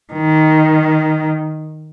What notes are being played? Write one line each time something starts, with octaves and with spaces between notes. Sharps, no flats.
D#3